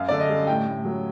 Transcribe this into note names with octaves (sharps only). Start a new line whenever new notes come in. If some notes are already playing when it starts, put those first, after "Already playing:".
Already playing: F#2 F5
D3 D5
D#5
G3
A2 G5
A2
F#3